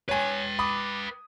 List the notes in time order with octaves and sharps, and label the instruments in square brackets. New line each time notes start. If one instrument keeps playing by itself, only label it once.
[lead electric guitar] B4 G5 [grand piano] C#5 G#5
[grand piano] B5 D6 D#6